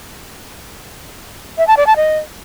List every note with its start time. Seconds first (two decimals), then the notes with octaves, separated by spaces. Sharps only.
1.58 E5
1.67 A5
1.77 D5
1.87 A5
1.96 D#5